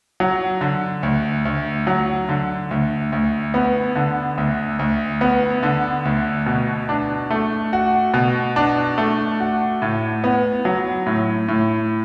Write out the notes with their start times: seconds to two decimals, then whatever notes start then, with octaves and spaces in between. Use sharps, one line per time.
0.20 F#3
0.61 D3
1.03 D2
1.45 D2
1.87 F#3
2.29 D3
2.71 D2
3.12 D2
3.54 B3
3.95 D3
4.38 D2
4.79 D2
5.21 B3
5.63 D3
6.05 D2
6.46 B2
6.89 D4
7.30 A3
7.73 F#4
8.14 B2
8.56 D4
8.98 A3
9.40 F#4
9.82 A2
10.24 B3
10.65 F#3
11.06 A2
11.48 A2